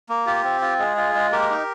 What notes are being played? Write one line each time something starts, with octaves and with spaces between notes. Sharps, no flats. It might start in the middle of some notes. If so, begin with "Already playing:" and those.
A#3
F4 G4
C4
F4
G#3 G#4
F4
G#3
A#3 G4 A#4
D#4